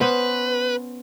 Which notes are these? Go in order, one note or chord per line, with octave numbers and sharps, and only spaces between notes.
B3 C#4 B4 C5